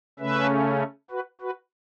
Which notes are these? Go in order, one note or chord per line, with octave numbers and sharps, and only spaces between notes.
C#3 A3 C#4 B4 E5
F#4 B4
F#4 B4